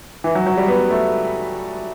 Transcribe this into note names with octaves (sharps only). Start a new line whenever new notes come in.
E3
F#3
F#3
G3
B3
A3